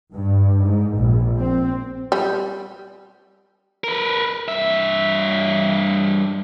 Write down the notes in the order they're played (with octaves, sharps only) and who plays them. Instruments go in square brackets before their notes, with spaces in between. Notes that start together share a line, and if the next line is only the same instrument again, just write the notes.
[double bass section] G2
G#2
A#1
C4
[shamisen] G3
[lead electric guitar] A#4 B4
G2 E5